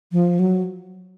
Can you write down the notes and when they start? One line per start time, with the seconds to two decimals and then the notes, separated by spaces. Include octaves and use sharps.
0.12 F3
0.39 F#3